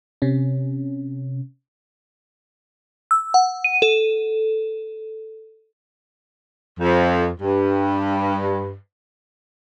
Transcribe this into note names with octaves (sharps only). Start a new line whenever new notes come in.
C3 C#4
E6
F#5
D#7
A4
F2
G2